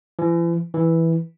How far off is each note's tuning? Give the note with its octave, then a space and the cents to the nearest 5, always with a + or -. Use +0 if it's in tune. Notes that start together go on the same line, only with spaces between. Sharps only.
E3 +40
E3 -5